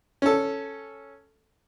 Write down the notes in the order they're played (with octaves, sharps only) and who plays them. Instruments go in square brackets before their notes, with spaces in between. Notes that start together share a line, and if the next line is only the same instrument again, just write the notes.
[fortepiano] C#4 A4